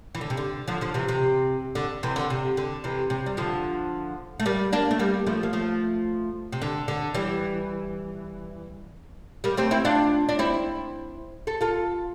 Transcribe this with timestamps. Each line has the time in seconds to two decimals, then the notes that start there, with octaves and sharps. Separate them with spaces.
0.15 E3
0.21 D3
0.30 C3
0.37 D3
0.68 D3 F3
0.81 D3 F3
0.94 C3 E3
1.08 C3
1.75 D3
2.03 C3 E3
2.16 D3
2.30 C3
2.57 D3
2.84 C3 E3
3.10 C3
3.26 G3
3.37 D3 F3
4.40 A3
4.46 G3 A#3
4.73 A#3 D4
4.91 A3
4.99 G3 A#3
5.26 F3 A3
5.43 A#3
5.53 F3 A3
6.52 C3
6.62 D3
6.88 D3
7.14 E3 G3
9.44 G3 A#3
9.57 A3 C4
9.71 C4 E4
9.85 D4 F4
10.29 D4
10.39 C4 E4
11.47 A4
11.61 F4 A4